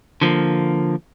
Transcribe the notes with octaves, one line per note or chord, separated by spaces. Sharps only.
D3 F3 A#3